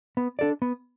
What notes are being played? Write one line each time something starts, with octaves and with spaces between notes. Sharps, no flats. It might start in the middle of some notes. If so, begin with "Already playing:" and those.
B3
D4 A4 D5
B3